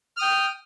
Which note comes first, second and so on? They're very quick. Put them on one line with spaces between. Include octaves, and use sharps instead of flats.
F6 D#6 G5